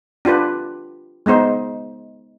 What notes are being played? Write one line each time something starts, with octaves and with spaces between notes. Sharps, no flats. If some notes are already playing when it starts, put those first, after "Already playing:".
D4 F4 G4 B4
G#3 B3 D#4 C5